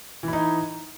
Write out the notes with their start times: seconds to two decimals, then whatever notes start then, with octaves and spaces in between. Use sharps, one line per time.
0.23 E3
0.28 E4
0.33 D#4